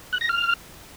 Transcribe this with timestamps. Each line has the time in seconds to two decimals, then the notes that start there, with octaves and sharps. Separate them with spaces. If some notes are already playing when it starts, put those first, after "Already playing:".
0.13 F#6
0.21 A#6
0.29 F6